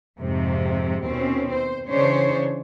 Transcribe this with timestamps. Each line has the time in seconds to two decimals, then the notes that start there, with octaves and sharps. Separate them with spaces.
0.19 F2 G#2 C3
1.06 D#2 B2 C4 C#4
1.52 C5
1.89 C#3 E3 D4 C5 C#5